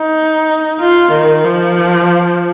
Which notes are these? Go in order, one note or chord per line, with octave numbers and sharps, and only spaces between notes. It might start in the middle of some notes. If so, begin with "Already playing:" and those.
Already playing: D#4
F4
D#3
F3